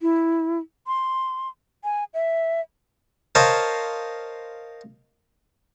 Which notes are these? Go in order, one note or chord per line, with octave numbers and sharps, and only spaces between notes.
E4
C6
G#5
E5
A#4 C5 C#5 D#5 F5 A5